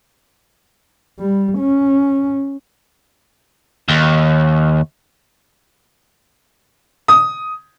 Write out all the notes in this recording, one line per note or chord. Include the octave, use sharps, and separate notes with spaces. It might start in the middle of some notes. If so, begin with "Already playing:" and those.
G3
C#4
D#2
D#6